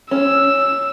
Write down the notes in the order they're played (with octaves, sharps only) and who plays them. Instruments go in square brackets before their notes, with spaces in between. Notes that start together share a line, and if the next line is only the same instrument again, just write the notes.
[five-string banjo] C#4 [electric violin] E6